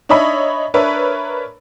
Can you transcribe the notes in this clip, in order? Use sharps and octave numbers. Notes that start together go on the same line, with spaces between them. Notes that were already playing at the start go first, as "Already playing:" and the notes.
D4 D#4 C#5 D#5 E5 B5
D4 A#4 B4 C#5 E5